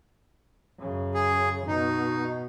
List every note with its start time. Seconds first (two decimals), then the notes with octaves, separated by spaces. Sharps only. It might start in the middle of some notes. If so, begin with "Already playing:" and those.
0.80 F#2 C#3
1.14 G#4
1.67 B2 D#4